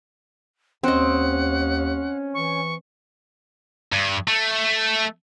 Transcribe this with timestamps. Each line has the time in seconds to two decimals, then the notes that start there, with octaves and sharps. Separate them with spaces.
0.83 D#2 C4 C#4 D#5 F#5
2.34 E3 C#6
3.93 G2
4.28 A3